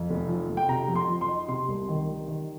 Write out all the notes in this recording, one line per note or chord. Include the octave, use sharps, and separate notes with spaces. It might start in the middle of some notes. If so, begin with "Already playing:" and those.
Already playing: F2
F1
F3
F1
G5
C3 A#5
F2
C6
F3
C6
D#4
C3 C6
C2
D#3
G3
D#3